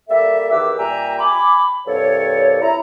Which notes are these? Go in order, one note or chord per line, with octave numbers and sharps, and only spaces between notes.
G3 A#3 A4 E5
E2 D#3 G4 B4 D6 E6
A#2 G3 E5 G5 G#5 A#5
G#5 B5 D6
C2 G2 A4 C#5
E4 A#5